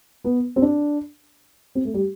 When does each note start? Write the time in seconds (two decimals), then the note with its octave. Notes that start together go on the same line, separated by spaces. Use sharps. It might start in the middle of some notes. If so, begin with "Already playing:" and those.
0.24 B3
0.56 C4
0.62 D4
1.75 C4
1.85 A3
1.94 G3